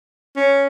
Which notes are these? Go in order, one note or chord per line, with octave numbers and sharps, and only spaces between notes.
C#4